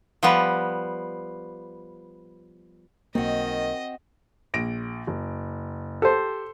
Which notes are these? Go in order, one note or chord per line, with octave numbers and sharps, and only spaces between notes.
F3 G3 B3 B4
B1 D#3 A#3 C4 F#4 D#5
A#1 A#6 D7
F#1
G4 A4 C5